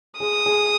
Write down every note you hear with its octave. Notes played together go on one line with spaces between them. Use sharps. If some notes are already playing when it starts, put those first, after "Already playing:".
G#4 D#6
G#4